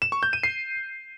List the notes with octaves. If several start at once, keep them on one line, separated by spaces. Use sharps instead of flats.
E7
C#6
G6
D#7
C7